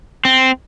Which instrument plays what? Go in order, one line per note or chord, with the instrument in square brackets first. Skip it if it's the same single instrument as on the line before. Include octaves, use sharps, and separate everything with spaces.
[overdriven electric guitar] C4